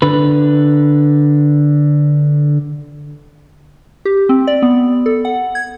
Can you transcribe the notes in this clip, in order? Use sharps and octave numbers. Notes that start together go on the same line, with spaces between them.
D3 B4
G4
C4
D5
B3
A4
F#5
G#6